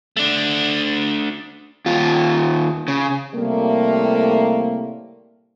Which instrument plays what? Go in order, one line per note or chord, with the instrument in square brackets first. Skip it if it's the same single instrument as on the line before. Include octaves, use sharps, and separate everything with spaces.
[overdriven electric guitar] A3 D4
D#2 F4
C#3
[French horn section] A2 C3 G3 A3 A#3